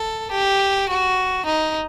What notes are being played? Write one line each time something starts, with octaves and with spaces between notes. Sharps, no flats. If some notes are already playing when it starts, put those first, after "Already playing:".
Already playing: A4
G4
F#4
D#4